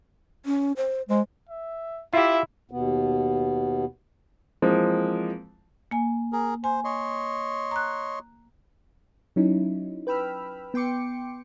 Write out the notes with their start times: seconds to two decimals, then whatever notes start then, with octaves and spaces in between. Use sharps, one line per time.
0.46 C#4
0.77 C5
1.09 G#3 C5
1.49 E5
2.14 E4 F4 G4 E5
2.71 D#2 B2 B3
4.62 E3 F3 G#3 A#3 C4
5.91 A#3 G#5
6.33 G#4 A#4
6.64 C5 G#5
6.84 C#5 D#5 C6
7.71 A#5 F#6
9.36 F#3 C#4 D#4 E4
10.07 B4 G5 B5 E6 F6
10.74 B3 G5 C6 D6 C#7